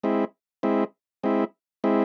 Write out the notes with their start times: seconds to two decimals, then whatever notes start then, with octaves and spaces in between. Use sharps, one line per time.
0.03 G#3 C4 E4
0.63 G#3 C4 E4
1.23 G#3 C4 E4
1.84 G#3 C4 E4